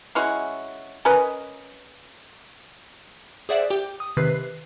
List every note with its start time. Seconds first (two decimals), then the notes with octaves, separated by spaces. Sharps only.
0.15 G#3 C#4 E4 F#4
1.05 C#4 A#4 B4 D#5
3.49 G#4 C5 D5 E5 F#5
3.70 G4 G5
4.00 D#6
4.17 C3 D#3 B4 F#6 C7